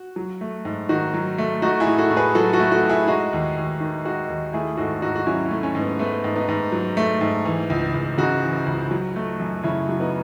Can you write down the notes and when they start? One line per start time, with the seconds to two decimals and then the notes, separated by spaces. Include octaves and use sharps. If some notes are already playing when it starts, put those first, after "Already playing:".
Already playing: F#4
0.16 F#3
0.41 A3
0.65 G#2
0.89 D#3 D#4 F#4
1.14 F#3
1.38 A3
1.62 A3 D#4 F#4
1.80 E4 G#4
1.87 A2
1.98 F#4 A4
2.11 A2
2.17 G#4 B4
2.35 F#3 F#4 A4
2.53 F#4 A4
2.60 A3
2.71 F#4 A4
2.83 A2
2.89 E4 G#4
3.08 G#3 D#4 F#4
3.33 D#2
3.57 D#2
3.80 D#3
4.05 G#3 D#4 F#4
4.29 D#2
4.53 A3 E4 G#4
4.77 G#2 F#4 A4
5.02 G#2 D#4 F#4
5.16 F#4
5.26 F#3 C#4 E4
5.45 C#4 E4
5.51 A3
5.63 C#4
5.75 G#2
5.81 B3
5.99 A3 B3
6.24 G#2
6.36 B3 D#4
6.48 G#2
6.72 F#3
6.97 A3
7.21 G#2
7.45 E3
7.70 C#2
7.94 C#2
8.18 C#3 D#4 F#4
8.43 E3
8.66 C#2
8.91 F#3
9.16 A3
9.40 F#2
9.63 C#3 C#4 E4
9.89 F#3
10.00 B3 D#4